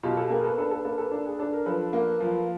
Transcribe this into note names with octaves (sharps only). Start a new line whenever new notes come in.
B2 F4 G4
G4 A4
A#3 G#4 A#4
A4 B4
D4 A4 B4
A4 B4
A#3 A4 B4
A4 B4
D4
G#4
D4 A4
A#4
F3 A4 B4
A#3
F3